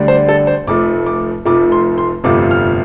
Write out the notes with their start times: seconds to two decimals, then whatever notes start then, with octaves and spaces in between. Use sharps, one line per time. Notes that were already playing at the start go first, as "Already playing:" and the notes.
Already playing: D2 D3 G3 D4
0.08 C5
0.29 A4
0.47 C5
0.67 F1 F2 F3 A3 D6
1.06 D6
1.45 F1 F2 F3 A3 D6
1.72 C6
1.98 C6
2.24 G1 F2 C3 A3 F4 D6
2.51 F6